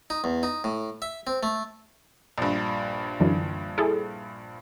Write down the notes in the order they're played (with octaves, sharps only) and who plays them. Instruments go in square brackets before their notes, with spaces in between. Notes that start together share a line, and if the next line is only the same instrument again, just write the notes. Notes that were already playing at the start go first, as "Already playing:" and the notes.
[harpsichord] D#4
E2
D#4
A2
E5
C4
A3
[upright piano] A#1 G2
[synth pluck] F#2 D3 E3
E4 G#4 A4